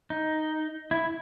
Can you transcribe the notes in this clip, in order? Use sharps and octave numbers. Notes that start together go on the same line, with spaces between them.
D#4
E4